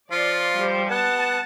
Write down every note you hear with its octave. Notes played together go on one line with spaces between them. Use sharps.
F3 F4 D5
G3 G4 C5
B3 F#5 A5